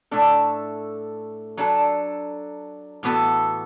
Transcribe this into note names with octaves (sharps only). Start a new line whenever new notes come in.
A2 A3 D4 A4
F#3 D4 A4
A2 E3 B3 F#4 A4